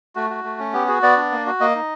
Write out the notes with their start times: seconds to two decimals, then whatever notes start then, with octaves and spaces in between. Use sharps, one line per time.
0.16 A3 F#4
0.30 F#4
0.44 A3
0.59 C#4
0.73 B3 G4
0.88 F#4 G#4
1.03 B3 D5
1.16 D4
1.31 A#3
1.46 F#4
1.61 A#3 D#5
1.75 D#4